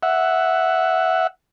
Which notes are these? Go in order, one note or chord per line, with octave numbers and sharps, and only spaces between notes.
E5 F#5